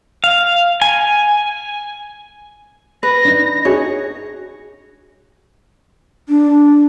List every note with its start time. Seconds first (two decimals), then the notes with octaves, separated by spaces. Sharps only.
0.24 F5
0.82 G#5
3.03 B4 A#6
3.25 D4 D#4
3.65 D#4 F#4 G#4 C#5
6.29 D4